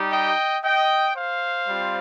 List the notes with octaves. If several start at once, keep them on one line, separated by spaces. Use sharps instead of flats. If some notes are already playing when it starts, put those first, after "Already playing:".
Already playing: G3 D#4 G4
D#5 G5
D#5 G5
C5 F5
G3 C4 F4